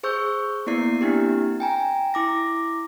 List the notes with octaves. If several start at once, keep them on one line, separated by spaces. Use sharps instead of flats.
G#4 C5 C#6 E6 G6
A#3 B3 E4 D5 C7
A#3 C4 D4 E4 G4
G5 G#5 A#5
E4 D6 A#6